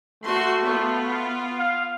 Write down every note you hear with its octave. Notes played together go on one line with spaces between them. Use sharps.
A3 F#4 C6
B3 F4
F5